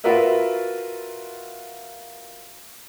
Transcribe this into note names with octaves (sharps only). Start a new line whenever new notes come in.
F4 F#4 A#4 B4 E5